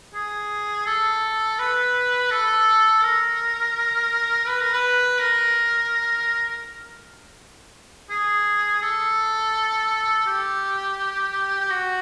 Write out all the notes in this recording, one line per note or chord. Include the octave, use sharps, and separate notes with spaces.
G#4
A4
B4
A4
A#4
B4
A#4
B4
A#4
G#4
A4
G4
G4
F#4